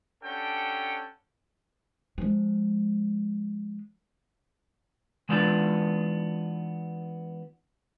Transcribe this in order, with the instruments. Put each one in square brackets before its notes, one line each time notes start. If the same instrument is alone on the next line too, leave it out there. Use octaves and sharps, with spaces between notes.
[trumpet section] G3 C#4 D4 A4 F#5 G5
[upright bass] F3 G#3
[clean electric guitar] E3 G#3 B3 D4 D#4 F4